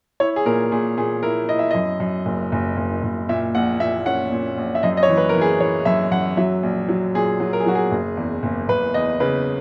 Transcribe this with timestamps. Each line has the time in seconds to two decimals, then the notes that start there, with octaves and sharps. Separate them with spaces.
0.20 E4 C#5
0.36 G#4
0.45 A#2 A#4
0.72 A#2 G#4
0.97 A#2 G#4
1.23 E4 A#4
1.49 E4 D#5
1.59 E5
1.71 F#2 D#5
2.00 F#2
2.26 F#1
2.52 F#1
2.77 F#1
3.04 F#1
3.29 A#2 E5
3.55 A#1 F#5
3.80 A#2 E5
4.06 C#4 F#5
4.32 A#2
4.58 A#1
4.75 E5
4.83 F#2 D#5
4.97 D#5
5.03 C#5
5.09 E3
5.17 B4
5.29 A#4
5.35 E3
5.41 G#4
5.60 E3 C#5
5.85 F#2 E5
6.11 F#2 F#5
6.37 F#3 E5
6.63 A#1
6.89 F#3
7.15 A#2 G#4
7.40 F#3
7.53 A#4
7.60 G#4
7.66 F#3 F#4
7.75 G#4
7.91 F#1
8.17 E2
8.43 F#1
8.69 F#1 B4
8.94 E2 D#5
9.20 C#3 B4